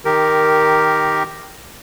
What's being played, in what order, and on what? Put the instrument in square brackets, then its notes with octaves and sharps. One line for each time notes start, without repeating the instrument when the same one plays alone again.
[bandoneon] D#3 G4 A#4